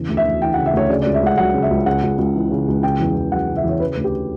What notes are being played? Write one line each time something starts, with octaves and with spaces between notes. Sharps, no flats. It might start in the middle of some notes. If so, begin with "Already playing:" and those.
Already playing: E2 C#3
D2
E5
D2
E3 G5
F#5
C#3
E5
D2 C#5
C#3 D5
D5
C#2
E5
C#2 F#5
F#3 F#5
C#3
E5
C#2
C#3 F#5
C#2
C#2
E3
C#3
C#2
C#3 G5
E2
E2
F#3 F#5
C#3
E5
E2 C#5
C#3 B4
B4
D2
G4